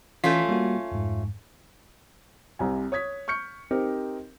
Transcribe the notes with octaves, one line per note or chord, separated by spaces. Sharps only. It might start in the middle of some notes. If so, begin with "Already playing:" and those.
E3 A3 C#4 F4 B6
G3 A#3 F#4
F2 G#2
C2 C3 G#5
C#5 D#6 G#6 B6
C#6 F6 G6 C#7
C4 D#4 G4 A#4 C5